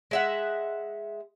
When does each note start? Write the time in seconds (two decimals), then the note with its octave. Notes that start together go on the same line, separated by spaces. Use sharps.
0.11 G#3 E5 F#5